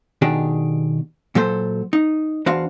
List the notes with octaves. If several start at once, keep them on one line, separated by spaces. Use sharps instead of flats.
B2 D#3 D4 G4 G#4
A#2 F#3 A4 C5
D#4
E2 D4 F#4 C5 F5